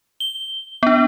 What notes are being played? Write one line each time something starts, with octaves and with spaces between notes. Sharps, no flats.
G7
B3 D4